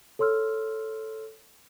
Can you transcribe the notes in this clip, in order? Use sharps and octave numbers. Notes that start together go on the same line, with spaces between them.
A4 C#5 C6 E6 F6